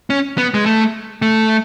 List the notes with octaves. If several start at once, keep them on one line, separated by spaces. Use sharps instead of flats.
C#4
B3
G#3
A3
A3